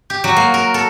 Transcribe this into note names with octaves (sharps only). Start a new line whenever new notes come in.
G4
F#3
A#3
A#4
A4